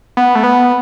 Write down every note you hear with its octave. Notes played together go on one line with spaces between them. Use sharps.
B3
A3
B3